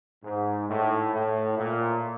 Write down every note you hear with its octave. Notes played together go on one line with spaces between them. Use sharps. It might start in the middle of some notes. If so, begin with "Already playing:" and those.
G#2
A2
A2
A#2